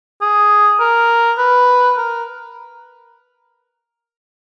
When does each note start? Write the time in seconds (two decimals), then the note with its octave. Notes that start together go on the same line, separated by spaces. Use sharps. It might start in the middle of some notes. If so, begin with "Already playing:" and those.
0.21 G#4
0.80 A#4
1.38 B4
1.97 A#4